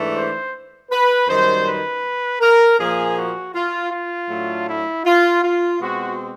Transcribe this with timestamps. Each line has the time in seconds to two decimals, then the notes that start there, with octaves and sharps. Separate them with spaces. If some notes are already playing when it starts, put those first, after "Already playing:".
Already playing: G#2 E3 A3 D4
0.14 C5
0.91 B4
1.28 F#2 D#3 G3 C5
1.66 B4
2.40 A#4
2.78 A#2 F3 A#3 G#4
3.16 F#4
3.54 F4
3.91 F4
4.29 A2 F#3 A3 D4
4.67 E4
5.05 F4
5.43 F4
5.81 B2 G#3 C4 F#4